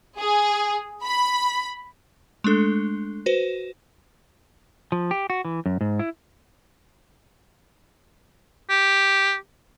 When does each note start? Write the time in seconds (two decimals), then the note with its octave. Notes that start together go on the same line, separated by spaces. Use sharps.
0.17 G#4
1.03 B5
2.44 G#3 A3 D4 A4
3.26 F#4 B4 C5
4.92 F3
5.11 G4
5.30 F#4
5.45 E3
5.66 F#2
5.81 G#2
5.99 E4
8.70 G4